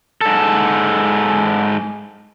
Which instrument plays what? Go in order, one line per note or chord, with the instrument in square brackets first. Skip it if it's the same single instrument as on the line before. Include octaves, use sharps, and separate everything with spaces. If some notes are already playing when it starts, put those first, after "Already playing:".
[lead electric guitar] G#2 A4